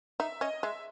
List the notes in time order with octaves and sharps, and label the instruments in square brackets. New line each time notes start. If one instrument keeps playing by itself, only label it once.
[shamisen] D#4 [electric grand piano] E5
[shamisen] C#4 [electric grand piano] D#5
[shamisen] G#3 [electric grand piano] E5